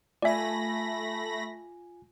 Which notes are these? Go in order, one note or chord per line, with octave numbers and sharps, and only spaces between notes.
A3 F4 D5 E5 G#5 B5 A#6